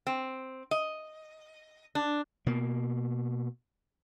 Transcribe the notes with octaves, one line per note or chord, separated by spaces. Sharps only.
C4
D#5
D4
B2 A#3